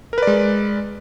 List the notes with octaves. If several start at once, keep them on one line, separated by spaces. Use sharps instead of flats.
G#3 A#4 B4 D5